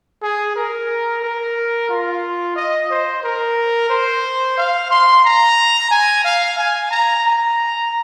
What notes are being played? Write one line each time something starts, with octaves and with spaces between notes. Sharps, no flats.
G#4
A#4
A#4
F4
D#5
C5
A#4
C5
F5
C6
A#5
G#5
F5
G#5
A#5
A#5